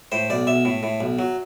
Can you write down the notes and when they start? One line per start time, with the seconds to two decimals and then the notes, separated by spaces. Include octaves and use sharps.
0.12 A2 C5
0.30 B1 D5
0.47 B1 E5
0.65 A2
0.83 A2
1.00 B1
1.19 F#3